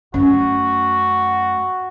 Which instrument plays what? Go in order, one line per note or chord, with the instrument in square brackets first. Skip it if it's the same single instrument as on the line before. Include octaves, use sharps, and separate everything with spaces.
[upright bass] F#2 A3 [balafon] C#4 [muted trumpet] F#4